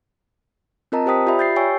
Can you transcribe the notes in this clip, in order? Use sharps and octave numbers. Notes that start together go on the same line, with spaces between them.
C4 F4 A#4 D#5 A5 A#5
G4 C5 G5 D#6 B6
F4 G4 D5 E5 B5
G6 A6 C7
G4 C#5 G5 G#5 C#6 E6